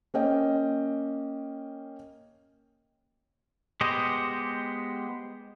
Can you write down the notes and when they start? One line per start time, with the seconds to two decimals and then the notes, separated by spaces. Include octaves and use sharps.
0.14 A#3 C#4 D#5 G5
3.81 G#3 B3 G4 C5 D#5